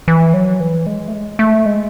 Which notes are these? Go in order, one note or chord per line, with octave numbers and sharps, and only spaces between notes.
E3
F#3
E3
G#3
A3
G#3
A3
G#3